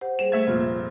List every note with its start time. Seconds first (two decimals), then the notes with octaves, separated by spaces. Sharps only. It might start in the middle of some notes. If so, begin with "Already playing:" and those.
0.01 G4 C5 F#5
0.19 G3 G#4 C5 E7
0.32 A3 E5 G#6
0.47 F1 A#2 C5 F6 G#6